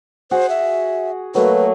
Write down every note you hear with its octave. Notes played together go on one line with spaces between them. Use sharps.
F#4 G#4 C5 F#5
E5
F#3 A3 A#3 B4